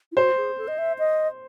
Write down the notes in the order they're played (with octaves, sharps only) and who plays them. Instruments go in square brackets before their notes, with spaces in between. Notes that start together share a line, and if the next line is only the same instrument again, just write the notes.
[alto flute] E4
[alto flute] F#4 [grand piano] C5
[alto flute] G#4
A4
D#5
E5
D#5